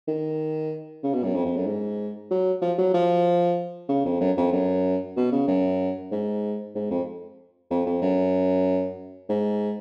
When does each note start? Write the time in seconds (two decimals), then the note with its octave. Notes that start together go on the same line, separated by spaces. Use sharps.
0.08 D#3
1.03 C#3
1.14 B2
1.24 F#2
1.35 F2
1.46 F2
1.56 F#2
1.67 G#2
2.31 F#3
2.62 F3
2.78 F#3
2.94 F3
3.89 C#3
4.05 F2
4.20 F#2
4.37 F2
4.52 F#2
5.16 B2
5.32 C#3
5.47 F#2
6.11 G#2
6.75 G#2
6.91 F2
7.70 F2
7.86 F2
8.02 F#2
9.29 G#2